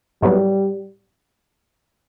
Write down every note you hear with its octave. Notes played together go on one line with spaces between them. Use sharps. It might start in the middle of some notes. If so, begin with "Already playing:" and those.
A2 F#3 G3 B3